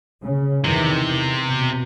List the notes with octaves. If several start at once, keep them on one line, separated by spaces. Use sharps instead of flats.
C#3
E2 C3 D#3 E3
B2